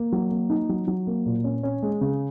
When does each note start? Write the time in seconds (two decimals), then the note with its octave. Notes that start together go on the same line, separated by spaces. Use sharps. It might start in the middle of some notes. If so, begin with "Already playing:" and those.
Already playing: A#3
0.12 F#3
0.31 A#3
0.50 D#4
0.69 F#3
0.88 F#3
1.07 A#3
1.26 A#2
1.44 C#4
1.63 C#4
1.83 G#3
2.01 C#3